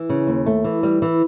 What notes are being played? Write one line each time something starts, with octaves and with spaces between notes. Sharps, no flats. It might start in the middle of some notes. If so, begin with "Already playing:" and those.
Already playing: E3
C#3
D#2
A3
E3
G3
E3